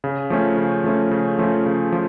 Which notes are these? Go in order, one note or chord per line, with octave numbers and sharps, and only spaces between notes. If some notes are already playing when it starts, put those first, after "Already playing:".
C#3
F3 A3 C#4
C#3
F3 A3 C#4
C#3
F3 A3 C#4
C#3
F3